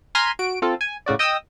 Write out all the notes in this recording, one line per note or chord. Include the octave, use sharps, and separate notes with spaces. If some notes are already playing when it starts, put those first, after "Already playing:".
G#5 A#5 C6 F6 B6 D#7
F#4 D7
C4 F4 A4
G#5
A2 C#3 F#4 D5
D#5 G5 D#6 E6